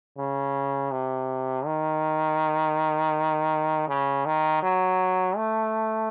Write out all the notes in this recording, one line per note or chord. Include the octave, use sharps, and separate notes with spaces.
C#3
C3
D#3
C#3
D#3
F#3
A3